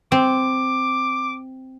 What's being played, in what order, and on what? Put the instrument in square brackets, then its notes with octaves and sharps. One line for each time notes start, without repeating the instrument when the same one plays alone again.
[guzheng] C4 [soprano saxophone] D6